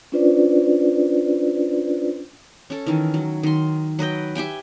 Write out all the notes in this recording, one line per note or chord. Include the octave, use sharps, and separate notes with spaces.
C#4 D4 F4 B4 C5 D5
C#4 A4
D#3 E3
F#3
D#3 C6
F#3 B4 D#5 G5
G4 E5 G5 G#5